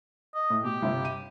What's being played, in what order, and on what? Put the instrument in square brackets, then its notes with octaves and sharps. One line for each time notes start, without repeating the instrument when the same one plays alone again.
[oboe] D#5
[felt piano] A2
[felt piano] B2 [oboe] G4
[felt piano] G1 C3
D#7